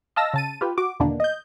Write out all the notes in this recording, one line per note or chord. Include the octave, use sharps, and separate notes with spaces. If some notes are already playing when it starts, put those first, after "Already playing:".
D#5 F5 A5 E6 A#6
C#3 A5 D#7
F4 G4 B4
F#4 D6
E2 B2 D3 D#3 A#3 D4
D#5 G6